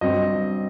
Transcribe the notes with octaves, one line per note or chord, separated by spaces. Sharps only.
G2 F#3 C4 D#5